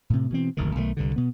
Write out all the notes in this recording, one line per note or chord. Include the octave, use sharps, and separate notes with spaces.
A2 C3
B2 E3 C4
F1 D2 G#2 D#3
B1 D#3 E3 A3
C2 G2 D3
B2 B3